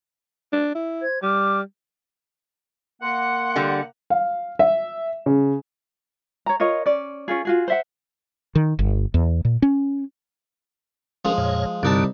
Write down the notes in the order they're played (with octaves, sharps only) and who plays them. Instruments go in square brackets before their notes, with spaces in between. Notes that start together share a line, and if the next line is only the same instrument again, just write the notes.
[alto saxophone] D4
E4
[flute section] C5 G#6
[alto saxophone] G3 [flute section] D6 F6
[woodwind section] A#3 F#5 [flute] C6
[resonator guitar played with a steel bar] D3 G3
[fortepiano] F5
E5
C#3
[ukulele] C#5 A#5
F4 A#4 C#5 D#5
C#4 D5
C#4 F4 G#4
F4 F#4 G#4
C5 E5 F#5
[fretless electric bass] D#3
G1
E2
A#2
C#4
[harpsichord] F3 G#3 [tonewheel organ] C#4 A#4
[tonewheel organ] F2 A#2 C#5
[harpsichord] C2 D#4 A5 [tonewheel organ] G2 D3